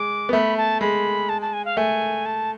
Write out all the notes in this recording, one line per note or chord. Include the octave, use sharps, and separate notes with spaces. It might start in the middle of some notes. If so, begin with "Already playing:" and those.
Already playing: G#3 D6
B3
A3 B5
A5
G#3 B5
A5
A5
G#5
F5
A3 G#5
A5